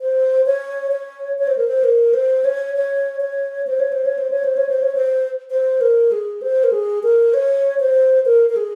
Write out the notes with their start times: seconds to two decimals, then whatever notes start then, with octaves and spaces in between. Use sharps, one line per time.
0.01 C5
0.46 C#5
0.91 C#5
1.38 C#5
1.47 C5
1.57 A#4
1.68 C5
1.84 A#4
2.14 C5
2.44 C#5
2.76 C#5
3.20 C#5
3.67 C5
3.79 C#5
3.92 C5
4.05 C#5
4.18 C5
4.30 C#5
4.44 C5
4.57 C#5
4.69 C5
4.82 C#5
4.95 C5
5.50 C5
5.81 A#4
6.12 G#4
6.42 C5
6.64 A#4
6.72 G#4
7.03 A#4
7.34 C#5
7.79 C5
8.26 A#4
8.49 A#4
8.56 G#4